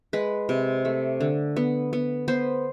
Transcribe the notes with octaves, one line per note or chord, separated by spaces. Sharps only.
G#3 B4
C3
A3
D3
B3
B3
B3 C5